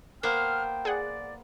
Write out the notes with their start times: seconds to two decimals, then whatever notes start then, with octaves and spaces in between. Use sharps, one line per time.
0.23 A#3 B3 C5 G5 F6
0.85 G#4 D5 F#5